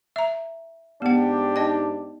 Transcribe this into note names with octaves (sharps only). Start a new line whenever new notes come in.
E5 A#5
G#2 B3 D4 G4 F#5
D#4 D#5 A5